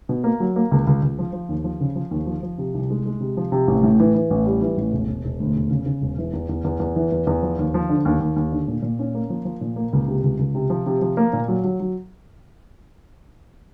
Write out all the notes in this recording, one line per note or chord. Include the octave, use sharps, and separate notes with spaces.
B2
A#3
F#3
A#3
C#2
C#2
C#2
F3
F3
D#2
F3
C#3
F3
D#2
F3
F3
C3
C2
G#3
G#3
C3
F3
C3
A1
A2
E3
E3
A1
G3
E3
A1
E1
E1
E1
D2
E1
C#3
C#3
E1
E3
E2
E2
E2
E2
E3
E2
E2
F3
D#2
F3
D3
D#2
D#2
D#2
D3
A#2
A#2
C#4
A#3
F3
F3
A#2
A#3
C#2
C3
C#2
C#2
C3
F3
C3
F3
A#3
A#2
F#3
F#3
F#3